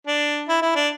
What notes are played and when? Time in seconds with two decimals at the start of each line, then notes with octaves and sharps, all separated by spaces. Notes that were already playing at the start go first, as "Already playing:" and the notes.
0.07 D4
0.49 E4
0.62 E4
0.76 D4